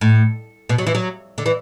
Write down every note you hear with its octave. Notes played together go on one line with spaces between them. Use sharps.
A2
B2
F#3
E3
F#3
D3
E3